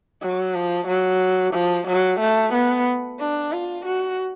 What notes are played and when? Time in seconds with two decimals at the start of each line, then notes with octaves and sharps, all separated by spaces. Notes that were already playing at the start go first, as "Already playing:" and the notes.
0.22 F#3
0.55 F3
0.87 F#3
1.53 F3
1.87 F#3
2.20 A3
2.53 B3
3.19 D4
3.52 F4
3.86 F#4